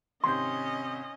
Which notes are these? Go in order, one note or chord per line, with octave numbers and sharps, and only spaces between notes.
G#1 C3 C#4 D#5 C6 G6